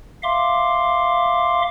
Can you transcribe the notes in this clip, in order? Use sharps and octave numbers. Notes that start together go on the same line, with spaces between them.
E5 F5 C6 D6